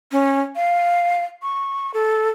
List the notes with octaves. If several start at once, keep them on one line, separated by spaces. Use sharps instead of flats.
C#4
F5
C#6
A4